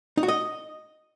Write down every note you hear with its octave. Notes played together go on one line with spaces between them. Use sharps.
D#4
F#4
D#5